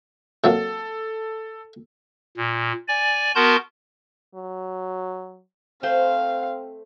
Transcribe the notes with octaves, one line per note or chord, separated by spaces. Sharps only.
C3 F#3 A#3 A4
A#2
D5 G#5
B3 F#4 A#4 A5 C6 G6
F#3
A3 C4 C5 F5